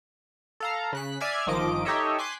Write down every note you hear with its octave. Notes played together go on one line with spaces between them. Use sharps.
A4 F5 A#5
C#3 F#6 B6
D5 E5 G#5 F6 G#6 C7
G1 D#3 F3 D#5 D6 D7
D#4 G4 A4 C#5 D#5 E5
G#5 C6 D6 F#6 B6 C7